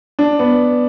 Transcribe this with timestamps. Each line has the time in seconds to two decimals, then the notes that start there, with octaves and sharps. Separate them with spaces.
0.19 D4
0.39 B3